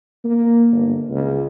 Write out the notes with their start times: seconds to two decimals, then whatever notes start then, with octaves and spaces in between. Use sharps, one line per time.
0.24 A#3
0.72 G1
1.10 C#2